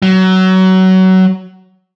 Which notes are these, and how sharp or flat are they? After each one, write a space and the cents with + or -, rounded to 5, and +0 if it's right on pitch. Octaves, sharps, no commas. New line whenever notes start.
F#3 +20